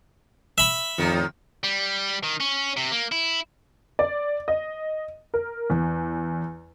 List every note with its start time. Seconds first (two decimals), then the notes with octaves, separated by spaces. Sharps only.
0.58 E5 B5
0.98 F2 A2 D#3
1.64 G3
2.24 D#3
2.40 C#4
2.77 C3
2.92 A#3
3.12 E4
3.99 D5
4.48 D#5
5.34 A#4
5.70 E2